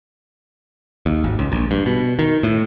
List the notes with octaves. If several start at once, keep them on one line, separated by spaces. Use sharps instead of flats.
D#2
G#1
C#2
A#1
G2
B2
D#3
A2